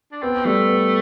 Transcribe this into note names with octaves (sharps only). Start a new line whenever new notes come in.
D4
B3 C4
G3 A3
B3